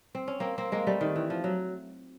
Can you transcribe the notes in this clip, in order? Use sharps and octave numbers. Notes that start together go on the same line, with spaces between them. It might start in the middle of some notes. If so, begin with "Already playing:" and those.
C4
C#4
A#3 C4
A#3 C4
G#3 A#3
G3 A3
D#3
E3
F3
F#3